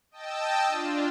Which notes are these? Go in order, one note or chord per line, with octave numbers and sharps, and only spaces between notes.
D#5 G5 A5 E6
D4 F4